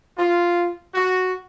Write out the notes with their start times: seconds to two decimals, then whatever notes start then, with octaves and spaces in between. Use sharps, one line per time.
0.17 F4
0.94 F#4